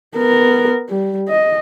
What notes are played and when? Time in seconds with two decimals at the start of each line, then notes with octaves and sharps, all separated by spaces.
0.16 B3 A#4
0.89 G3
1.29 D#5